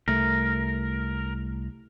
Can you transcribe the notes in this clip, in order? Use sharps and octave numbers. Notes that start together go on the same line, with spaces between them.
C2 A3 A#4